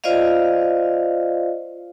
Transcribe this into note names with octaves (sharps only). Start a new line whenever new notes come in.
F4 C5 D5 D#5 F5